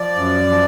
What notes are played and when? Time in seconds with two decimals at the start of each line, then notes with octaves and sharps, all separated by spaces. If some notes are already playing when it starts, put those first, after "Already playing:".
Already playing: F3 D5
0.15 F#2
0.50 F3